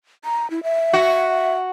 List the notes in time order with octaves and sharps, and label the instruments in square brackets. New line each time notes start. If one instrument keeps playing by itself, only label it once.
[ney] A#5
E4
E5
[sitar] F#4